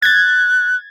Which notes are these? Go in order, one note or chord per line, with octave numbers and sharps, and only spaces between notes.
F#6 G#6 A6